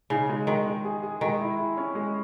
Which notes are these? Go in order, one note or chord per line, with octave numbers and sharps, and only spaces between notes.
C#3 D#4
G#3
D#3 G#3
G#3
G#4
G#4
D#3 G#3
E4
E4
C#4
G#3